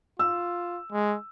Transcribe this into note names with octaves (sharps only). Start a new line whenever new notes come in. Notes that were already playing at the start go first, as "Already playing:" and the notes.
F4 E6
G#3